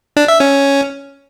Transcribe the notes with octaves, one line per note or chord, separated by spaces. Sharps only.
D4
E5
C#4